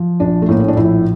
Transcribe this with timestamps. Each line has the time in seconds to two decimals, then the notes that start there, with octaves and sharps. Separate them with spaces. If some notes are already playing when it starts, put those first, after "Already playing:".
Already playing: F3
0.20 A#1 D4
0.42 A3
0.49 A2 A#3
0.60 C#4
0.68 D4
0.77 A#1 E4